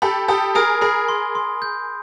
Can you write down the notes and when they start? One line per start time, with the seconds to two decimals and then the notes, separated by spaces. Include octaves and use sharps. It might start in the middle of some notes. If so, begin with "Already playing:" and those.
0.02 G4 A4 B5
0.28 G4 A4 D#6
0.55 G#4 A#4 D#6
0.81 G#4 A#4 B5
1.08 C6
1.35 C6
1.62 G6